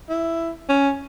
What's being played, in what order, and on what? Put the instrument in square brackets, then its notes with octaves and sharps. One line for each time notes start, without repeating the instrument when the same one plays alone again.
[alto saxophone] E4
C#4